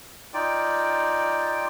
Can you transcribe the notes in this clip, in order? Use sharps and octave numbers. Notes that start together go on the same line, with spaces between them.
D#4 F4 D5 G5